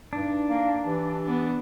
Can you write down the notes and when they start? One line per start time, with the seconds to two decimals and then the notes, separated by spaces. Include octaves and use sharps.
0.13 G2 D4 D#4
0.50 A#3
0.85 E3 G4
1.24 B3 D4